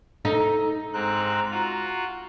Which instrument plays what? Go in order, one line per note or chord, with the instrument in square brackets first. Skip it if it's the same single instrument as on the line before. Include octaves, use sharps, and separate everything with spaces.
[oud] D#4 [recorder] A4
[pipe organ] G#2 C4 F#6 [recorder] A#5
[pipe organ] F4 F#4